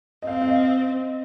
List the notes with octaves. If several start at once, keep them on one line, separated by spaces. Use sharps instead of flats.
D#5
C4 F5
F5
D#5